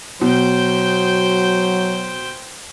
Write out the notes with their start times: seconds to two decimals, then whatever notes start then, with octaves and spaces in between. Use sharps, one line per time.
0.21 B2 F#3 C5 G5